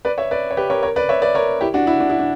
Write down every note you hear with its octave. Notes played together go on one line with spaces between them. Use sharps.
B4 D5
C#5 E5
B4 D5
C#5
G4 B4
A#4 C#5
A#4 C#5
B4 D5
C#5 E5
B4 D5
A#4 C#5
E4 G4
D4 F#4
E4
D4
E4
D4